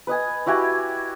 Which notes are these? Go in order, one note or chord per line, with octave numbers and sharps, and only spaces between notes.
B4 D#5 G#5
E4 F#4 G4 G#5